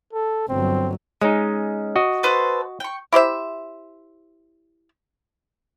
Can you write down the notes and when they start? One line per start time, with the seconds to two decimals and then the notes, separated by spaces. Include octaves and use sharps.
0.13 A4
0.49 G1 F#3 C4
1.21 G#3 C#4 D#4
1.96 F#4 D#5
2.23 A4 B4 C5
2.80 G5 C#6
3.13 E4 G4 C5 E5